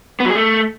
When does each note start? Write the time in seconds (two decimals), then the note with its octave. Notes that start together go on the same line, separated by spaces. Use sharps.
0.20 B3
0.25 F#3
0.30 G#4
0.35 A3